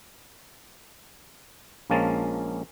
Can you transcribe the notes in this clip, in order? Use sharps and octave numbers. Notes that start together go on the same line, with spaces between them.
A#1 F3 G#3 A#3 C#4 A5